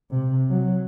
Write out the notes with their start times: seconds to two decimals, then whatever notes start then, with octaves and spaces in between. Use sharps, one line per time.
0.11 C3
0.50 F#3